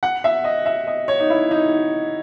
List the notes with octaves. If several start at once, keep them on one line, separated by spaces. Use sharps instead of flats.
F#5
E5
D#5
E5
D#5
C#5
D#4
E4
D#4